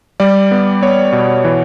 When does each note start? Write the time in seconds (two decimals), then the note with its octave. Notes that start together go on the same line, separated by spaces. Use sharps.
0.20 G3 D5
0.51 B3
0.82 B3 C#5
1.12 B2
1.44 E3